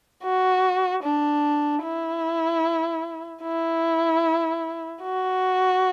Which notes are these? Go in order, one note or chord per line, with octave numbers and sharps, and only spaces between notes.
F#4
D4
E4
E4
F#4